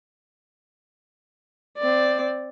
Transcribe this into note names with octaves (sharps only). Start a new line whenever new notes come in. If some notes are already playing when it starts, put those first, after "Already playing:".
C4 D5